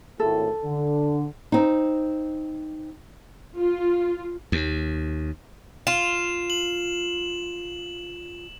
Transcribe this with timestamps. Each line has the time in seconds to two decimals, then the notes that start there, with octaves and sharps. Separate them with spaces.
0.20 G#1 A2 A4
0.63 D3
1.52 C4 D#4
3.57 F4
4.52 D#2
5.87 F4 E7
6.50 F#7